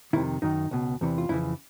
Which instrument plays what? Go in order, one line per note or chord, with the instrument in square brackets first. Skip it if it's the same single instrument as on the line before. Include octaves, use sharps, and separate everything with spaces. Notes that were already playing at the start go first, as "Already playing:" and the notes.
[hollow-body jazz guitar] F2 C3 D#3 E4
F#2 D#3 D#4
C#2 B2
E2 C3 E3
F4
F2 C#3 E3 E4